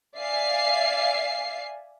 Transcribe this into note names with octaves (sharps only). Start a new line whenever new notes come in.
D5 E5 F5 G#5 C7